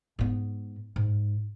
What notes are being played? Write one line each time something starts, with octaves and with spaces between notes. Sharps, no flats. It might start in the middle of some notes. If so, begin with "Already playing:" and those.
G#2 B3
G#2